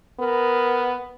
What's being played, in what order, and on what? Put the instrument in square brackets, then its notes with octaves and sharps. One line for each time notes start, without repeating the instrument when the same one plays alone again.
[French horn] B3 [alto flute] A#4